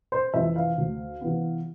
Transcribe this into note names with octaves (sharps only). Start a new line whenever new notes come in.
C5
F2 C3 E3 E5
F5
D2
C3 E3 B3